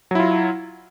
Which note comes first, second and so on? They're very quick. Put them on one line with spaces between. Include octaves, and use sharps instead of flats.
F#3 E4 F4